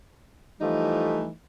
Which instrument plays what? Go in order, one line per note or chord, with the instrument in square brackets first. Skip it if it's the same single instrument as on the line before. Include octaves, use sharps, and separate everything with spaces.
[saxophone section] E3 F3 G3 A3 D#4